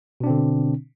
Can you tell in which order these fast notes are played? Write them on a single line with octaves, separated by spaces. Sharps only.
B2 D4 C4 D3